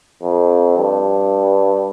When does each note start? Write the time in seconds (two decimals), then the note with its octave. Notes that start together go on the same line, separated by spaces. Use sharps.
0.23 F2
0.77 G2